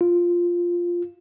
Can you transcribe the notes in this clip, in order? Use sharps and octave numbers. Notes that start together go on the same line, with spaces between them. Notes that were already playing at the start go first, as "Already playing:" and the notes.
F4